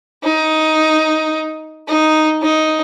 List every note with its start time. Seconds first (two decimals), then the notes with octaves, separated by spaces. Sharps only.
0.24 D#4
1.88 D#4
2.42 D#4